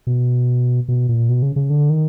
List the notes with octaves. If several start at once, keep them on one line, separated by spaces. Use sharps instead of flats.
B2
B2
A#2
B2
C#3
C#3
D3
D#3